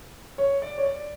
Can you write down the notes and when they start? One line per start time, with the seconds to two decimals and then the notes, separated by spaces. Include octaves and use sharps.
0.38 C#5
0.62 D5
0.78 C#5
0.85 D5